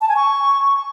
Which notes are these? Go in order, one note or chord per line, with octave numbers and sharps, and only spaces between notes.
A5
G#5
C#6